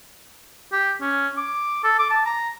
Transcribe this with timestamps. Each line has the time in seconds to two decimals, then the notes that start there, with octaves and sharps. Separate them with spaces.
0.72 G4
1.02 C#4
1.37 D6
1.84 A4
1.99 D6
2.10 A5
2.26 A#5